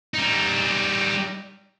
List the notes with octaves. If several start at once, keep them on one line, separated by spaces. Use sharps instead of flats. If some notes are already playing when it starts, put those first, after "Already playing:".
G3 D#4